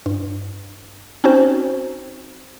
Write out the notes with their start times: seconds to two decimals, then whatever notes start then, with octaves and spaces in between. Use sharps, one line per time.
0.06 G2
1.24 C4 C#4 D#4 F#4 C5